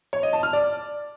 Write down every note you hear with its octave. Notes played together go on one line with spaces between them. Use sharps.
C#5
D#5
A5
F6
D5